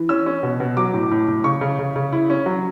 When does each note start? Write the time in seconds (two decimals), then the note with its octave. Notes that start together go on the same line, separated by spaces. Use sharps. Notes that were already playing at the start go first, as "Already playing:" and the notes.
Already playing: E3
0.09 C#4 E6
0.26 C#4
0.43 B2
0.60 B2
0.77 F#3 D6
0.94 A2
1.11 A2
1.28 A2
1.44 C#3 C#6
1.61 C#3
1.79 C#3
1.96 C#3
2.13 E4
2.30 C#4
2.46 F#3